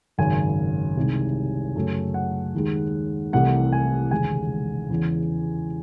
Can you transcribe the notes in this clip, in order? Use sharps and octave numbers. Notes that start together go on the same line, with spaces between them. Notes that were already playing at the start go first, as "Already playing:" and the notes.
G#1 F#2 C#3 G#5
C2 C3 D#3 G#3
F#2 C#3 F#3 A3
F#5
D#2 D#3 G#3
C2 C3 E3 A3 F#5
G#5
E1 D#2 C#3 G#3 G#5
E2 C#3 E3